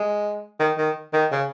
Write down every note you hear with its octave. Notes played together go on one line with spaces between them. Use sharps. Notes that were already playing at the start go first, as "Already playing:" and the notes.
Already playing: G#3
D#3
D#3
D#3
C#3